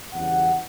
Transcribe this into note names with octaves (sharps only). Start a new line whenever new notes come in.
E2 C#3 G3 F#5